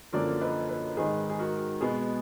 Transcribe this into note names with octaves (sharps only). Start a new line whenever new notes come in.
F#2 D3 F3 A#3 A#4 D5
B4 D#5
B4 D#5
G#2 D#3 G#3 G#4 B4
G#4
F#4 A#4
B2 G#3 B3 G#4